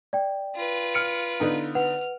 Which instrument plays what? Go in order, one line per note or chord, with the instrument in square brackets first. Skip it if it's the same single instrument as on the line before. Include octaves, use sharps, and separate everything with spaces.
[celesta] D5 G5
[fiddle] F4 B4
[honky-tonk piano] F6 C#7 D7
D3 B3 D#4
[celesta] B4 F#5 [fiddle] F6